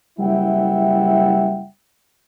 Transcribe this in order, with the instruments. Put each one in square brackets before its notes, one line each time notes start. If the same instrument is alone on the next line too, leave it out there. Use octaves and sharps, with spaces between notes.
[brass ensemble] F#1 G3 E4 E5 F#5 G5